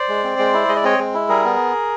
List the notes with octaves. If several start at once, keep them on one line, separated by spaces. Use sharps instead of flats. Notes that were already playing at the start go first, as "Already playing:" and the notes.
Already playing: C5 D5
G#3
C4
G#3
E4
G#3 D#5
D5
C4 C#5 D#5
G#3
E4
G3 G#4 A#4
B3